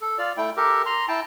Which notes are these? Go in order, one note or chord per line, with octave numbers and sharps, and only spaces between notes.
A4
F4 D5
A3 E4 G5
G4 A4 A#4
A#5 C6
E4 G5 A5